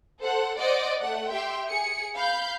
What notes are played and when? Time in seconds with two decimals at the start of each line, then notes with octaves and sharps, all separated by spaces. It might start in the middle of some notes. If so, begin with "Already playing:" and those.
0.21 A4 C5 F#5
0.59 C5 D5 D#5 F#5
0.99 A3 F#5
1.30 G4 E5 G5 C6
1.68 G#4 C#7
2.15 F5 B5 G6